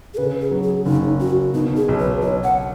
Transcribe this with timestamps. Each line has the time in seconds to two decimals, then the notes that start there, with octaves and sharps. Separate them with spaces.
0.14 G#4
0.17 C#3 B4
0.41 G#4
0.51 F#3
0.63 G#4
0.86 F#1 D#4
1.20 F#1 F#4
1.54 B2 D#4
1.77 G#4
1.88 B1
1.99 B4
2.22 B1 C#5
2.44 F#5